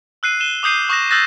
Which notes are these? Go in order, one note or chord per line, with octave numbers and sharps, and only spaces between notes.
E6 F#6 C7 D#7
D#7 E7 G7
D6 D#6 G6 C7 D#7
C#6 D#6 F#6 A#6 E7
D#6 E6 F#6 G6 A6 A#6